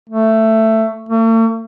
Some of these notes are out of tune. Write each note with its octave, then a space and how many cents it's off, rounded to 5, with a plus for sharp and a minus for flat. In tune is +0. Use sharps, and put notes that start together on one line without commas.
A3 +10
A3 +45